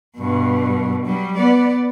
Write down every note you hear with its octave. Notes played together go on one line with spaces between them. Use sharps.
G2 B2
F#3 G3
B3 D5